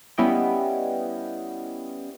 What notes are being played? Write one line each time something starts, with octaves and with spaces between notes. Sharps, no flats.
G3 B3 C#4 E4 D#5 G5